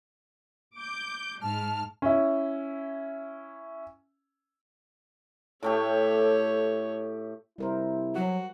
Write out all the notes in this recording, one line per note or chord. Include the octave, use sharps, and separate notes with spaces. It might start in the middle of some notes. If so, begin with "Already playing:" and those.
D6 G6
G#2 A5 F6
C#4 E4
A2 A3 G4 A4 C#5
C3 G3 E4 A#4 C5
F#3 F#4